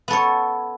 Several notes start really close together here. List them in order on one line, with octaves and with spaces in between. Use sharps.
B3 A4 C#5